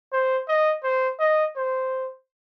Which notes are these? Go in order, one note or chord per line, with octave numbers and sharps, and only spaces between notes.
C5
D#5
C5
D#5
C5